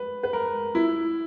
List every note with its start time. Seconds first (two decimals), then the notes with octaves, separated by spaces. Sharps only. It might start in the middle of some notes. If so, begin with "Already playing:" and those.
Already playing: B4
0.23 B4
0.33 A#4
0.75 E4